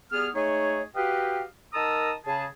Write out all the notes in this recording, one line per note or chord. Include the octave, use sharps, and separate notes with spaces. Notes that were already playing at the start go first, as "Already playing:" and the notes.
G3 B3 G#4 F6
G#3 A3 D#4 G#4 C#5
F#4 G4 B4 D#5 F5 G5
D#3 A#4 A5 A#5 D#6 E6
C#3 G#4 A5